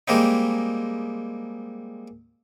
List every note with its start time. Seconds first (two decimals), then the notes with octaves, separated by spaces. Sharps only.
0.08 G3 G#3 A#3 C4 D#4